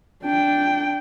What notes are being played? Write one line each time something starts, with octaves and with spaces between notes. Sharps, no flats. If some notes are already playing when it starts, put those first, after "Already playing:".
D4 G5